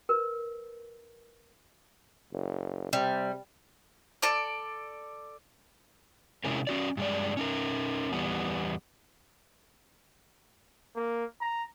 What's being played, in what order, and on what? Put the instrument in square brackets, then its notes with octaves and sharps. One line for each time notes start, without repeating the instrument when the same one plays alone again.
[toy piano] A#4 B4
[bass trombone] F#1
[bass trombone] C3 [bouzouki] G3
[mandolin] A4 D5
[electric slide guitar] C3 G#3 C#4 E4 G#4 A#4
C#4 F#4 D5
G2 G#3 D5
C#4 D#4 A#4
E2 G3 B3
[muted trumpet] A#3
A#5